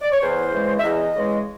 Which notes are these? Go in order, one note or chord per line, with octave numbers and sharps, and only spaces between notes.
D5
C#5
E2 C5
C#3 E3 G#3
E5
E2 D#5
C#3 E3 G#3